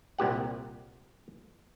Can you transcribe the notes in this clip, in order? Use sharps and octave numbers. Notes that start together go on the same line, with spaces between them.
C2 A#2 G4 F#5